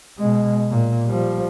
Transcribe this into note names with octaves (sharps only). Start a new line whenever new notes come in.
B2 G#3
A#2
F3 G3